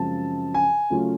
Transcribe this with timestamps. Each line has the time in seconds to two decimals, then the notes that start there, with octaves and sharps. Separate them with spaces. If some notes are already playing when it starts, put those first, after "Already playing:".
Already playing: F#2 C#3 F3 G#3 C4 A5
0.54 G#5
0.90 C#3 F#3 A3 C#4 F4